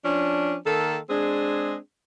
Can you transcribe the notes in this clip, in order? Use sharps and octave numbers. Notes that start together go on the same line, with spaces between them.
F3 C#4 D4
D#3 A#3 A4
G#3 C4 D4 G#4